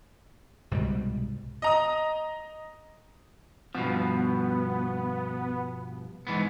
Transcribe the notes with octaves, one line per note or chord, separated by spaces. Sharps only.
C2 G#2 B2 G3
D#5 A#5 D#6
G2 B2 F3 B3
G#2 E3 B3